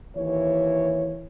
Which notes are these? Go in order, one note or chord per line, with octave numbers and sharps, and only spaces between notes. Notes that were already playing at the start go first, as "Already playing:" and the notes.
D#2 E3 C#5